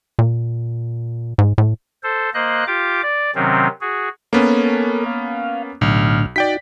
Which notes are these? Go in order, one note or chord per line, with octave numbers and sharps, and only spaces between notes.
A#2
G#2
A2
A4 C5
A#3 C5 D#5 F#6
F4 G4 D6
D5
C3 D#3 F#3 C4 C#4
F#4 G#4
A#3 B3 C#4 A4 A#4 C#5
F5
B1 A2 D3 F6
D#4 F#4 D5 G5 B6